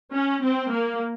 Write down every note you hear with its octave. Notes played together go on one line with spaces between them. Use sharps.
C#4
C4
A#3